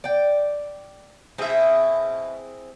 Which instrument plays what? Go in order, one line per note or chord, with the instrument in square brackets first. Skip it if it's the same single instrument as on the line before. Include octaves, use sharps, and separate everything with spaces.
[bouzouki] D5 G5
[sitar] B2 E5 [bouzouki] C4 E4 G#4